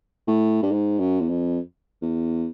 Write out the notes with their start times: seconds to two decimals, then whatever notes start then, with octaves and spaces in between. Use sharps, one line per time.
0.27 A2
0.63 G2
0.71 G#2
0.99 F#2
1.20 E2
1.29 F2
2.02 E2